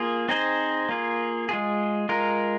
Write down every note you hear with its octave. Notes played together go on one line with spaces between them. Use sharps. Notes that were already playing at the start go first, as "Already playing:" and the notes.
Already playing: A#3 F4 G#4
C4 D#4 G#4 C5
A#3 F4 G#4
G#3 F4 G#4
G#3 F4 A#4